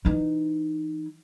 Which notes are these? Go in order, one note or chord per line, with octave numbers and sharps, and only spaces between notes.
E3 D#4